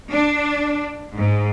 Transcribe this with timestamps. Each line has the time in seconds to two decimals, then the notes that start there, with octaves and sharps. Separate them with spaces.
0.12 D4
1.18 G#2